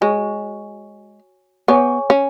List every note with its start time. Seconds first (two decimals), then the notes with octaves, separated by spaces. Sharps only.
0.01 G#3 F#4 C#5 G#5 C#6
1.68 B3 G#4 C#5 G#5 C#6
2.10 C#4